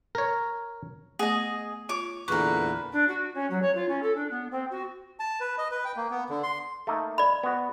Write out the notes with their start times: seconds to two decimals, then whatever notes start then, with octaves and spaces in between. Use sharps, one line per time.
0.15 A#4 C#5
1.19 A3 B3 G#4 D#5
1.89 F4 C#5 D6
2.28 E2 A#2 D3 A#4 B4 C#6
2.92 D4
3.08 F#4
3.34 C#4
3.50 F#3
3.62 C#5
3.75 F4
3.88 C#4
4.02 A4
4.15 D4
4.30 B3
4.51 C4
4.70 F#4
5.20 A5
5.40 B4
5.58 D#5
5.71 B4
5.85 G5
5.97 A#3
6.11 B3
6.30 D3
6.43 C6
6.87 A3 A#3 D#4
7.18 D5 B5
7.43 B3 F#4